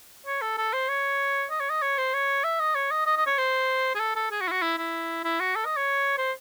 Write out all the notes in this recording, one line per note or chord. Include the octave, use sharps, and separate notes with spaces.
C#5
A4
A4
C5
C#5
D#5
C#5
D#5
C#5
C5
C#5
E5
D#5
C#5
D#5
D#5
D#5
C#5
C5
G#4
A4
A4
G#4
F#4
E4
F#4
E4
E4
E4
F#4
A4
D#5
C#5
C5